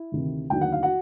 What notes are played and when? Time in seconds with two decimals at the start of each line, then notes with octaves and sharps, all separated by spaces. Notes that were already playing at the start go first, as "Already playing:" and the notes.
Already playing: E4
0.12 D2 C3 D#3
0.50 D#2 D3 F#3 G5
0.61 F#5
0.72 F5
0.82 F#4 F#5